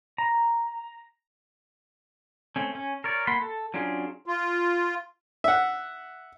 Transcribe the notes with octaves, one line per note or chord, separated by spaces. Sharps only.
A#5
A3 C4 C#4
C#4
A#4 C#5 D5
A#3 F#5 B5 C6
A4
F#3 C#4 D4 F4 G#4
F4
E5 F#5